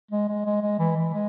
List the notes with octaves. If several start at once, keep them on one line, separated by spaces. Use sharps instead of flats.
G#3
G#3
G#3
G#3
E3
E3
G#3